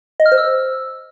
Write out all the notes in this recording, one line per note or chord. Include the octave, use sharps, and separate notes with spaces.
D#5
F6
C5
E6